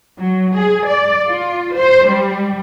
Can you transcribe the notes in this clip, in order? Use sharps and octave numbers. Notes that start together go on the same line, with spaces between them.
F#3
G#4
D5
F4
C5
G3